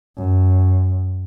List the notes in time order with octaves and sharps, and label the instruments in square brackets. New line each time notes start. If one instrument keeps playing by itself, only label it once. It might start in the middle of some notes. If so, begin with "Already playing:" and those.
[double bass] F#2